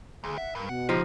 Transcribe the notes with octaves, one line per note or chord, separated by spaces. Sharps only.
D2 G#4
E5 F#5
G2 A#4
B2 F#5
C#2 F3 D#4 G4